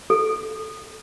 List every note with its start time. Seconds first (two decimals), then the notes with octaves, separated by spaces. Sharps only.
0.10 A4